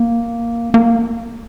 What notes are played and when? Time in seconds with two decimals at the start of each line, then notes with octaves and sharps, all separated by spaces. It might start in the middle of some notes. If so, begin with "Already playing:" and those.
Already playing: A#3
0.74 A#3